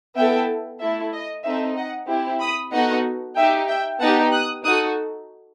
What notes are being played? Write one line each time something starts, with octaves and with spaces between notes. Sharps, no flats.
B3 E4 A4 E5 G5
A3 E4 A4 E5
D#5
C4 D#4 A4 E5
D#5 F#5
C4 E4 G4
B5 D#6
B3 D#4 F#4 A4 D#5 F#5
D#4 G4 E5 G5
E5 G5
B3 D#4 G4 F#5 A5
D#6 F#6
D#4 F#4 A4 D#6 F#6